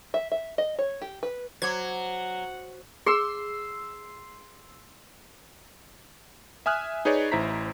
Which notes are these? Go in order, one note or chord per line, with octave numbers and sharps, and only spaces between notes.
E5
E5
D#5
C#5
G4
B4
F#3 C5 F#5 D6 G#6
G#4 C6 E6
E5 G#5 D#6 F6 F#6
D#4 G#4 B4 C#5 D5
A1 E4 C5 A#5 B6